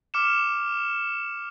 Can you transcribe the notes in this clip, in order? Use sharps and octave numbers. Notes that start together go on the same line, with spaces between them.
D6 F6 C#7 E7